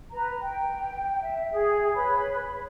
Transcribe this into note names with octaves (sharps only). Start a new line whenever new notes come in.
B4 A#5
G5
E5
G#4
B4 C#5 B5